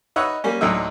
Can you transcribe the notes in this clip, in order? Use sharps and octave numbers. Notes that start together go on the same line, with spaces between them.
D#4 B4 C#5 E5 F#5 C#6
G3 A#3 C#4
A1 D2 D3 F#3 D#4 E5